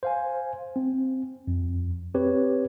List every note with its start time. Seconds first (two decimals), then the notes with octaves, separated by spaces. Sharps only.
0.03 C5 F5 G#5
0.76 C4
1.47 F2
2.15 C4 G4 B4 C#5